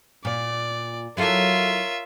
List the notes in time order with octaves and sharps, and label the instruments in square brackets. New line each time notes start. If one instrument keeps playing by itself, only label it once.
[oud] A#2 [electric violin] D5
[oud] F#3 E4 A4 [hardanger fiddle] F4 E5 [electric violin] A#4 C#5